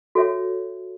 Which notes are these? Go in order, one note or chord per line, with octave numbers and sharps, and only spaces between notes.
F#4 A4 C#5 E5